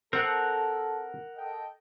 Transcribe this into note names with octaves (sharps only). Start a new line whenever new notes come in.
C4 A4 A#4 F#5 F#6
A4 D#5 G5